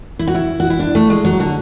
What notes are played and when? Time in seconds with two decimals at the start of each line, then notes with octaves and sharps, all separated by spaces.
0.19 E4
0.27 F#4
0.35 E4
0.60 F#4
0.70 E4
0.79 D4
0.95 A3
1.10 G#3
1.25 F#3
1.40 D3